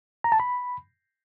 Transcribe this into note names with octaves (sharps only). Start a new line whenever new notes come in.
A#5
A5
B5